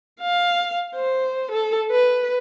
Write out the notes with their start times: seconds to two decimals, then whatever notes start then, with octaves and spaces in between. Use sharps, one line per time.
0.21 F5
0.95 C5
1.51 A4
1.91 B4